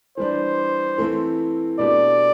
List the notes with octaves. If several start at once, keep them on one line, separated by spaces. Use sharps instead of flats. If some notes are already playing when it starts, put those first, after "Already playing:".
E3 G3 D4 C5
E3 A3 C4 E4
B2 A3 D4 G4 D5